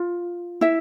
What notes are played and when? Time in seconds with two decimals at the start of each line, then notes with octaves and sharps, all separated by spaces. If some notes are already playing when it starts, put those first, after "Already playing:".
Already playing: F4
0.61 E4 E5